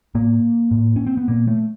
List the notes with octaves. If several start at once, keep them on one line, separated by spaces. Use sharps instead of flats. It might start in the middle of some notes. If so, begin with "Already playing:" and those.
A2 A#3
A2
C#4
C4
B3
A#2 A#3
A3